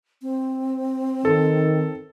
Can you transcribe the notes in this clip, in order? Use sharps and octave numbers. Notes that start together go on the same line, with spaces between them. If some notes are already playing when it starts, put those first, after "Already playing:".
C4
D#3 A4